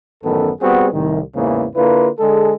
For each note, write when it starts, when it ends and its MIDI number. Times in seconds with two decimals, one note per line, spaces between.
0.24 0.50 33
0.24 0.50 42
0.24 0.50 51
0.24 0.50 59
0.24 0.50 69
0.60 0.87 55
0.60 0.87 59
0.60 0.87 60
0.60 0.87 66
0.60 0.87 68
0.92 1.20 36
0.92 1.20 45
0.92 1.20 51
1.35 1.66 33
1.35 1.66 40
1.35 1.66 44
1.35 1.66 49
1.35 1.66 52
1.35 1.66 58
1.75 2.08 50
1.75 2.08 58
1.75 2.08 64
1.75 2.08 65
1.75 2.08 71
2.18 2.53 50
2.18 2.53 56
2.18 2.53 68
2.18 2.53 69